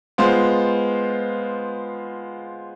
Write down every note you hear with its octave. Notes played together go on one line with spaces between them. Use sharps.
G#3 B3 F4 C5